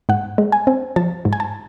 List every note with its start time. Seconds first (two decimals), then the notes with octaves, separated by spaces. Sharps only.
0.09 G#2 F#5
0.38 G#3
0.52 G#5
0.67 C4
0.96 F3 A5
1.25 G#2
1.33 G#5
1.40 A5